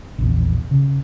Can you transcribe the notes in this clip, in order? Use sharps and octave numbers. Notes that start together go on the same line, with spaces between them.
A#1 E2 B2
C#3